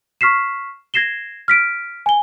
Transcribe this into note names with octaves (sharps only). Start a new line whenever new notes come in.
C#6 F6 B6 C7 E7
G#6 A#6 C7 E7 G7
F6 B6 D7
G#5 G7